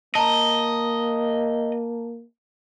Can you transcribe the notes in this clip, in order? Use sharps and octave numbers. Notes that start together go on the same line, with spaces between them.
A#3 D#5 A5 A#5